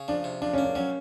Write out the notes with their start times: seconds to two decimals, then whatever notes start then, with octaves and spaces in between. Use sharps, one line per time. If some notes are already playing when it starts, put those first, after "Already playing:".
Already playing: C#3
0.08 F3 D4
0.24 C3
0.42 F3 D4
0.53 C#4
0.58 A#3
0.64 C#4
0.75 F#3 C#4